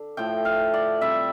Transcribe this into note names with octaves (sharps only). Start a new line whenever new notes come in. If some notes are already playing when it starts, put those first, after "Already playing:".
Already playing: D3
A2 F3 A3 G5
F5
D5
C3 G3 E5